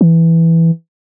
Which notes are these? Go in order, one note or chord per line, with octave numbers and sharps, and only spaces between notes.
E3